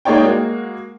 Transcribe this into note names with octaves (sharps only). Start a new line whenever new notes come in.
G#3 A#3 D#4 C#5 D5 G5
G#3 A#3 F#4